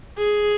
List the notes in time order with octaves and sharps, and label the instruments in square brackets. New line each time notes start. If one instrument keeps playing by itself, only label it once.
[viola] G#4